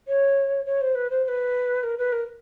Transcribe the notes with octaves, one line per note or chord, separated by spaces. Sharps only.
C#5
C#5
C5
B4
C5
C5
B4
A#4
B4
A#4